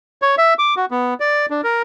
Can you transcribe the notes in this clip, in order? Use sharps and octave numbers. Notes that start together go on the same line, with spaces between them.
C#5
E5
D6
F#4
B3
D5
D4
A#4